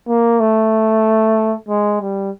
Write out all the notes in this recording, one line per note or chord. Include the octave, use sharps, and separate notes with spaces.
A#3
A3
G#3
G3